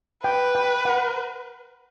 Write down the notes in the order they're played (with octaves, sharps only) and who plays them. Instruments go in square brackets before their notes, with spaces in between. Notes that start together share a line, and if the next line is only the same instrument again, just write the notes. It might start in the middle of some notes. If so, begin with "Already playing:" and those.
[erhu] B4 [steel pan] G5
[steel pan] G5
F#5